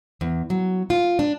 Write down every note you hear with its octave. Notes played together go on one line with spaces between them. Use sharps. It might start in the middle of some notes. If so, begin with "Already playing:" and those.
E2
F#3
F4
D4